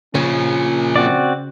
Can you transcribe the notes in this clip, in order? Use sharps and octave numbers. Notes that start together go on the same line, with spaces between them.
A#2 C#3 F3 C#4
C4 F#4 D5